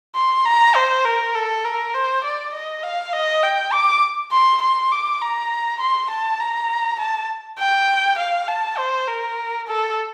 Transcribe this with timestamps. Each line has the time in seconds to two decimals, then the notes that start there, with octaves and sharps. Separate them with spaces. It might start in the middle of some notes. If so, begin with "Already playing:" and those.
0.16 C6
0.45 A#5
0.75 C5
1.05 A#4
1.35 A4
1.64 A#4
1.94 C5
2.24 D5
2.53 D#5
2.83 F5
3.13 D#5
3.43 G5
3.73 D6
4.32 C6
4.62 C6
4.92 D6
5.21 A#5
5.80 C6
6.10 A5
6.40 A#5
6.99 A5
7.59 G5
8.18 F5
8.48 A5
8.78 C5
9.08 A#4
9.67 A4